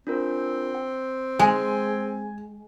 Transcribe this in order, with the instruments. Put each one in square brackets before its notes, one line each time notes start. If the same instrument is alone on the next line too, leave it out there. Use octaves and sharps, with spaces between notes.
[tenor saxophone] C4 [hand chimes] D4 F4 A#4
[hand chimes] G5
[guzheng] G#3 [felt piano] G#5